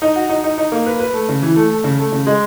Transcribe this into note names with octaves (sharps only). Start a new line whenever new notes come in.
D#4
F#4
D#4
D#4
D#4
A#3
B4
B4
A3
C#3
E3
A3
A3
C#3
A3
C#3
G#3